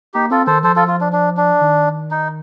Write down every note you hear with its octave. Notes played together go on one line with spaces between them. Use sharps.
A#3 D#4 G4
C4 F4 A4
D#3 A4 C5
F3 A4 C5
F4 A4
F4
D4
D4
D4
D#3
D#4